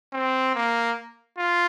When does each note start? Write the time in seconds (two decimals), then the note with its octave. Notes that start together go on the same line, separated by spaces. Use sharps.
0.13 C4
0.55 A#3
1.38 F4